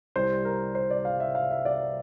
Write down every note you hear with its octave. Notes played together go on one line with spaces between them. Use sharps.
C2 C3 G3 C5
A#4
C5
D5
F5
E5
F5
E5
D5